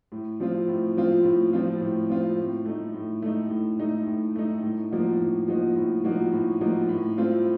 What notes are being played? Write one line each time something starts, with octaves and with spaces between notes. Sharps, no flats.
A2
F3 C4 F4
A2
F3 C4 F4
A2
F3 C4 F4
A2
F3 C4 F4
A2
A3 D#4
A2
A3 D#4
A2
A3 D#4
A2
A3 D#4
A2
F3 A#3 D#4 F#4
A2
F3 A#3 D#4 F#4
A2
F3 A#3 D#4 F#4
A2
F3 A#3 D#4 F#4
A2
A3 C4 F4